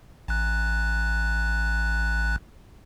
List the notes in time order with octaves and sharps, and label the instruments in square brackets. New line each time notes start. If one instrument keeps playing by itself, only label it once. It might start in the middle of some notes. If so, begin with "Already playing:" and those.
[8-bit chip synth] A1 F#6